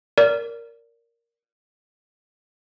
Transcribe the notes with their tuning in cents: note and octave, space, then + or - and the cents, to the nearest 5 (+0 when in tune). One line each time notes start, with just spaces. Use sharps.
A#4 +0 D5 -20